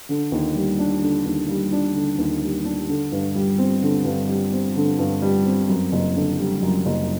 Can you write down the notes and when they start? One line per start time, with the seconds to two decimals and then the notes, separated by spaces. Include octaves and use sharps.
0.09 D3
0.32 D#2
0.55 G3
0.79 D4
1.02 D3
1.25 D#2
1.48 G3
1.72 D4
1.95 D3
2.18 D#2
2.42 G3
2.65 D4
2.89 D3
3.12 G2
3.35 G3
3.58 C4
3.82 D3
4.05 G2
4.29 G3
4.52 C4
4.76 D3
4.99 G2
5.22 G3
5.45 C4
5.69 F#2
5.92 F#1
6.15 D3
6.39 G3
6.62 F#2
6.86 F#1